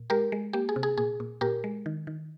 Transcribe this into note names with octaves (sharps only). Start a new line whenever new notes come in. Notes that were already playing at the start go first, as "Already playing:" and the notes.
Already playing: A#2
G#3 G4 A#4
G#3
A#3 G4
G#4
C3
G#4
A#2 G#4
A#2
A#2 G4 A#4
G#3
D#3
D#3